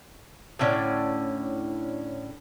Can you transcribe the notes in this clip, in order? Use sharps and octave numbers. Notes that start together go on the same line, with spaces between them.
A2 D3 C#4 D5